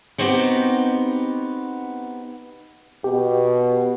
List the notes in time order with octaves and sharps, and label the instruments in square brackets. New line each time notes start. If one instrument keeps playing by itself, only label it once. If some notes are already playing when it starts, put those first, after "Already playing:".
[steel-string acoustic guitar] B3 C4 D#4 F#4 G4
[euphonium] B2 [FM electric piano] G4